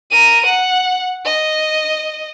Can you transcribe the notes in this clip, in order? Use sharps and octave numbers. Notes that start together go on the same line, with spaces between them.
A#4 D#7
F#5
D#5